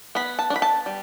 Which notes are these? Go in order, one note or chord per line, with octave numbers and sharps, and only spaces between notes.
B3 B5
A5
D4
B5
A5
G3